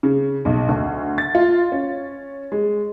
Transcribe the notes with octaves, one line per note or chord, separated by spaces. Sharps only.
C#3
B1
D2
A6
F4
C#4
G#3